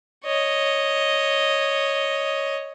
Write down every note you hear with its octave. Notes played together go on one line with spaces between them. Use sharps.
C#5 D#5